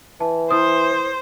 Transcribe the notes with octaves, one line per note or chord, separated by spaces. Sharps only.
E3 A5
E4 B4 C5 D#6